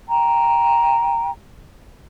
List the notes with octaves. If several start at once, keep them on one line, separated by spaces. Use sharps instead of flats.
G5 A#5